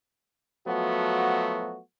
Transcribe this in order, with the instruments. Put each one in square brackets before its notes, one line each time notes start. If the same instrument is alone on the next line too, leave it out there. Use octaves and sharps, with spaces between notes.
[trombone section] F3 F#3 A3 B3 F#4